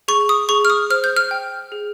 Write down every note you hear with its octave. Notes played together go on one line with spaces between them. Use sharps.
G#4 C#6
D#6
G#4 C#6
F6
D#6
C5 F6
G6
F6
G5
G#4